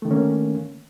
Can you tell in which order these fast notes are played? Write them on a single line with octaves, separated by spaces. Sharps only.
A3 D#3 D3 C#4 A#3